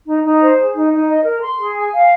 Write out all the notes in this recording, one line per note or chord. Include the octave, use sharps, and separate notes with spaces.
D#4
D#4
C5
G#4
D#4
D#4
D#5
A#4
C6
G#4
G#5
F5